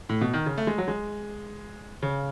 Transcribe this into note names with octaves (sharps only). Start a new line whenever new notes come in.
A2
B2
D#3
C#3
A3
G#3
F#3
G#3
C#3